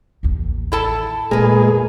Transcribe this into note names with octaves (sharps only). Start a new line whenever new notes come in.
A1 D#2
E4 A4 A5
F1 A#2 G#3 G#4 A#4 B4